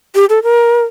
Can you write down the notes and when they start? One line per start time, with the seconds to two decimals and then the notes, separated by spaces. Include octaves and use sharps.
0.15 G4
0.30 A4
0.43 A#4